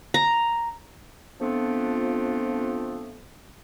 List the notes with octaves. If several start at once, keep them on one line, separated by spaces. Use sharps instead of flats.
A#5
F3 A3 B3 C4 D4 F4